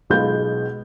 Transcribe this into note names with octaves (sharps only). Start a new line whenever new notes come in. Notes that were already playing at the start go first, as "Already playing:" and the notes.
B1 B2 G#3 B3 F4 G6